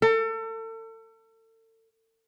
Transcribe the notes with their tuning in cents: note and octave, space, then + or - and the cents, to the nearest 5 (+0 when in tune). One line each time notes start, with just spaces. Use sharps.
A4 +35